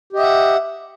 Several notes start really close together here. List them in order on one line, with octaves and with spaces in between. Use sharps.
G4 D#5 E5 F#5